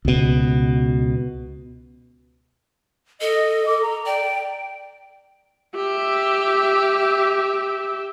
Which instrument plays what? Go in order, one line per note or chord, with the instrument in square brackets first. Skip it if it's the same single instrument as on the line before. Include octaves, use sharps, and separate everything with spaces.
[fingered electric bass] C#2 B2
[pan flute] A4 [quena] D#5
[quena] D6
A#5
[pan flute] D5 [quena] G5
[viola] G4 E5